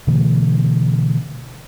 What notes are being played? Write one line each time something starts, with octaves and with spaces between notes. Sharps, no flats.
B2 D3 E3 A3